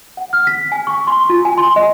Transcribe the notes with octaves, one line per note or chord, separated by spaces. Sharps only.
F#5
F6
B6
G#5
C#6
C6
F4
G#5
C6
D#5